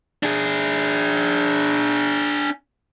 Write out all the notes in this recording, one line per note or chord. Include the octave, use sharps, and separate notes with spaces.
D4 G#4